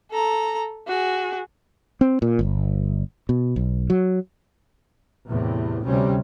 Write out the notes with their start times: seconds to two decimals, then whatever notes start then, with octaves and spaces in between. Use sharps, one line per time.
0.11 A4 A#5
0.87 F#4 G#4
2.01 C4
2.22 A#2
2.39 G1
3.29 B2
3.56 B1
3.90 F#3
5.28 E2 A2 C3
5.85 D2 C3 G3 C#4